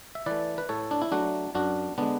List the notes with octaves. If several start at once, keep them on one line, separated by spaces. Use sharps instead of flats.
E5
E3 A3 B4 D5
B4
A2 A4 C#5
D4
E4
F#3 A3 D4 F#4
F#2 D4 F#4
D3 G#3 B3 D4